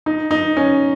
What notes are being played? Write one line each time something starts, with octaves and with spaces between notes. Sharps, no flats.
D#4
D#4
C#4